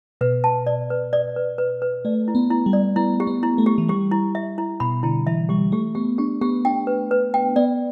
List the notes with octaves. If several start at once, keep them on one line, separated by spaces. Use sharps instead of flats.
B2 B4
A5
D5
B4
D5
B4
B4
B4
A3 D5
E4
B3
E4
G3
D5
B3 E4
G4
B3
E4
A3
G4
E3
G3 G4
E4
E5
E4
B2 B5
D3 E4
E3 E5
G3 G4
A3 G4
B3 G4
D4 G4
B3 G4
D4 G5
B4
B4
G5
B3 D5